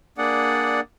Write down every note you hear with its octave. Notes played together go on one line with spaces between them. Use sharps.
A#3 D4 G#4 D5 F#5